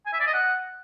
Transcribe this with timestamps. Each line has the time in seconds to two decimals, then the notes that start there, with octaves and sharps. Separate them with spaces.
0.06 G#5
0.13 E5
0.20 D5
0.27 D#5
0.34 F#5